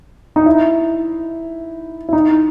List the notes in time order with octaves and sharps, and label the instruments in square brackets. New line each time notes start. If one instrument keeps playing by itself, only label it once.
[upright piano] D#4
E4
E4
D#4